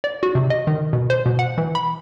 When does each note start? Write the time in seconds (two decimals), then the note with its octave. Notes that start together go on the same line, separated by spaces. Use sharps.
0.04 D5
0.23 F#4
0.35 C3
0.50 D#5
0.67 D#3
0.93 B2
1.10 C5
1.26 B2
1.39 F#5
1.58 E3
1.75 B5